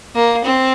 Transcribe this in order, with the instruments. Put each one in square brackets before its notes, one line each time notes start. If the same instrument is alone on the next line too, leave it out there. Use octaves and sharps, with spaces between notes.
[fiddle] A#3
C4